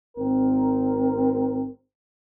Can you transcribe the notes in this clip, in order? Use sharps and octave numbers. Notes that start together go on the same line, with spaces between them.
G#1 C4 A#4